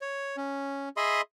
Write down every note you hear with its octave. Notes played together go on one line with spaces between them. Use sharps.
C#5
C#4
G#4 D#5 E5 B5 C6 D#6